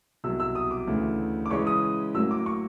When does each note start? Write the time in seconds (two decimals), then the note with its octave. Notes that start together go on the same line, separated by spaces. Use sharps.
0.24 C2 B2 F#3 E6
0.40 E6
0.55 D#6
0.71 D6
0.87 D2 C#3 E3 A3
1.46 D6
1.50 C#3 E3 G#3 C#4 C#6
1.67 D#6
2.14 A2 F#3 A#3 E6
2.31 D6
2.46 C#6